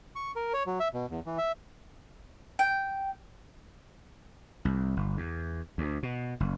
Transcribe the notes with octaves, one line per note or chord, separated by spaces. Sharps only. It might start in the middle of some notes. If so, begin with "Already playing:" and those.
C#6
A#4
C#5
F#3
E5
B2
E2
E3
E5
G5
C2
G1
E2
D2
B2
F#1